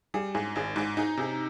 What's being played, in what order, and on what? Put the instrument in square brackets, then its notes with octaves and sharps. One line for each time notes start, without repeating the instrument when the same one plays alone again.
[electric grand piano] G3 [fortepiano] G#4
[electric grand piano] G#2 [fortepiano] G#4
[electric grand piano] G#1 [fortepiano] G#4
[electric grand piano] G#2 [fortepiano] G#4
[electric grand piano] D#4 [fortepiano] G#4
[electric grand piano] C3 [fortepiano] G#4